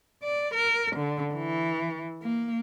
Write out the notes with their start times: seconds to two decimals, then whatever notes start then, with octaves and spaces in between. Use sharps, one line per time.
0.23 D5
0.54 A#4
0.96 D3
1.34 E3
2.23 A#3